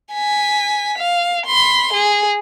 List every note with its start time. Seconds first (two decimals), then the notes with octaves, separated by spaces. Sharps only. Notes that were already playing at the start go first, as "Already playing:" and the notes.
0.13 G#5 B6
0.98 F5
1.46 B5 C6
1.93 G#4